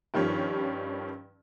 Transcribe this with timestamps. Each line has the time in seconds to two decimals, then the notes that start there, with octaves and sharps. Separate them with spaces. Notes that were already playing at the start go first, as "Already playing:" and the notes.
0.14 G2 D#3 F3 G3 C#4